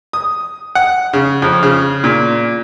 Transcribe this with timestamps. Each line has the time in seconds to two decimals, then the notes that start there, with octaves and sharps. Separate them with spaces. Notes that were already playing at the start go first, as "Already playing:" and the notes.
0.13 D#6
0.75 F#5
1.13 C#3
1.42 F2
1.63 C#3
2.04 A#2